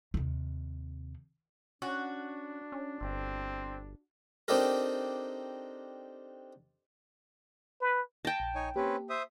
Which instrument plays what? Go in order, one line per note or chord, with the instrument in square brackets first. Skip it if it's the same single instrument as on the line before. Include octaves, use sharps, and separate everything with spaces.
[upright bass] D#2 C3
[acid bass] C#4 [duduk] D4 [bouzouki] F#4
[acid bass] C#4
[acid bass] G1 [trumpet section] C4
[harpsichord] C4 D4 D#4 G4 A4 A#4
[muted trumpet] B4
[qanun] G5 A5 [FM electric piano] A#6
[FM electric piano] A#1
[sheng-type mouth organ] D#4 C#5 G#5
[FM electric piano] A#3 G4 [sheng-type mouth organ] C4 C#4 B4
[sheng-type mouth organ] C5 E5 D#6